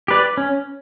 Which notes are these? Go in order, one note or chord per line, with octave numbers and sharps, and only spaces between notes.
G4 B4 D5
C#4